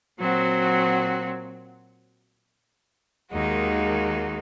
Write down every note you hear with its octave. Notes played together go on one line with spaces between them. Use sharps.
A#2 F#3 C4 F#4
D#2 D#3 G#3 D#4 F#4